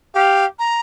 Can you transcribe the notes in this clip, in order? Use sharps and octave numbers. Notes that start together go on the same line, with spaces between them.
G4 F5
A#5